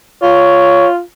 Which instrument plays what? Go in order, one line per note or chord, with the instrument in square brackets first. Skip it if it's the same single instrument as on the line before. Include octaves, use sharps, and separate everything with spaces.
[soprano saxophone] F4 [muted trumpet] C#5